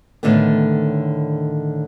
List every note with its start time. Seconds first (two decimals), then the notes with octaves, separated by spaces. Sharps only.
0.23 A2 D3 D#3 A3 B3